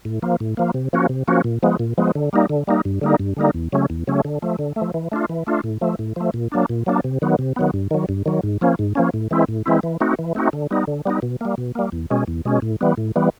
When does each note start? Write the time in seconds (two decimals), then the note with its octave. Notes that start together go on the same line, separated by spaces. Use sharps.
0.05 A2
0.22 F3 A#3
0.40 A2
0.57 F3 A#3
0.74 C3
0.93 F3 A#3 C#4 F#4
1.09 C3
1.28 F3 A#3 C#4 F#4
1.44 A#2
1.63 F3 G#3 B3
1.79 A#2
1.98 F3 G#3 B3
2.15 D3
2.33 G3 A#3 D#4
2.49 D3
2.67 G3 A#3 D#4
2.85 G2
3.01 D3 G3 A#3 D#4
3.19 G2
3.37 D3 G3 A#3 D#4
3.54 E2
3.72 C#3 F#3 A3 C#4
3.90 E2
4.07 C#3 F#3 A3 C#4
4.25 D3
4.42 F3 A3
4.59 D3
4.76 A3
4.82 F3
4.94 E3
5.12 A3 D4 F4
5.29 E3
5.47 A3 D4 F4
5.64 A2
5.81 F3 A3
5.99 A2
6.16 F3 A3
6.34 A#2
6.52 F#3 A#3 D4
6.69 A#2
6.86 F#3 A#3 D4
7.04 C3
7.22 D#3 F#3 B3
7.39 C3
7.56 D#3 F#3 B3
7.74 G2
7.91 D#3 F#3
8.09 G2
8.26 D#3 F#3
8.43 G#2
8.61 F3 A#3 C#4
8.79 G#2
8.95 F3 A#3 C#4
9.14 A2
9.31 E3 G#3 C4 E4
9.48 A2
9.66 E3 G#3 C4 E4
9.83 E3
10.00 A3 C4 D#4 F#4
10.19 E3
10.35 A3 C4 D#4 F#4
10.53 D3
10.71 G3 B3 D#4
10.87 D3
11.06 G3 B3 D#4
11.22 B2
11.41 G3 A#3
11.58 B2
11.75 G3 A#3
11.92 E2
12.10 B2 G#3 C#4
12.28 E2
12.45 B2 G#3 C#4
12.62 A2
12.81 E3 G3 B3
12.98 A2
13.16 E3 G3 B3